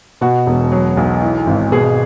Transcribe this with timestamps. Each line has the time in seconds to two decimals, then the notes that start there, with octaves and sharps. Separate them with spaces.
0.21 B2 F#4
0.46 E1
0.72 F#3
0.97 B1
1.21 E3
1.47 G#1
1.72 B2 G#4